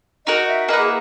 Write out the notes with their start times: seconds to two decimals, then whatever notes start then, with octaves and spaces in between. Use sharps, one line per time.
0.26 D#4 F#4 A#4 D#5
0.48 E5
0.69 A#3 E4 B4 D#5 F#5
0.79 G#4